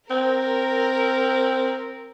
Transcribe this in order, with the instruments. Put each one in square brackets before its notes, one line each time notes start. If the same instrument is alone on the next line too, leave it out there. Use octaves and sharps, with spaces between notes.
[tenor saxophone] C4 [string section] A#4